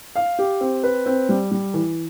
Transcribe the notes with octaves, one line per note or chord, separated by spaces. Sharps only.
F5
G4
C4
B4
C4
G3
G3
E3